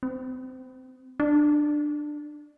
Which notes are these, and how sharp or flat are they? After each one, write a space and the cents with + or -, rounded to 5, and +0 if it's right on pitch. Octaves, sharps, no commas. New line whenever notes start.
C4 -25
D4 +15